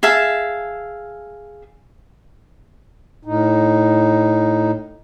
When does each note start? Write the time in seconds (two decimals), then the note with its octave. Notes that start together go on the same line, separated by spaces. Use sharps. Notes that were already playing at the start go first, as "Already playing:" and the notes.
0.03 G#4 E5 F5 A5
3.25 A2 D#4